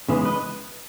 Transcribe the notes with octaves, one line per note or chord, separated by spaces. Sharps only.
C#3 E3 G#3 B3
B4 D#5